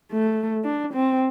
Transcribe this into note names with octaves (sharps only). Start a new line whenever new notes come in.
A3
D4
C4